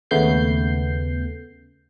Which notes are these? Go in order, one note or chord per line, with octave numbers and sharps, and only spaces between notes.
D#2 C#3 A3 B3 G6 C7